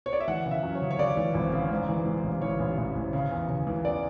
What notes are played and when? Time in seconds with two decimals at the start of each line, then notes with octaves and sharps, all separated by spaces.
0.06 C#5
0.13 D5
0.20 E5
0.28 E3 F#5
0.46 C#3
0.51 E5
0.63 F#2
0.75 C#5
0.81 C#3
0.91 C#5
0.99 C#3 D5
1.17 E3
1.35 G#1
1.52 C#3
1.71 G#2
1.89 E3
2.06 G#2
2.23 A1
2.42 E3 C#5
2.60 A1
2.78 A1
2.95 A1
3.13 C#3
3.31 E2
3.49 C#3
3.67 E3
3.84 E2 D5